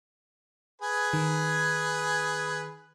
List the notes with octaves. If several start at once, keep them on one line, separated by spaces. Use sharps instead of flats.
G#4 B4 G#5
D#3